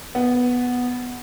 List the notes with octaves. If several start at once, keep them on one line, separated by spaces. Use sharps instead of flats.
B3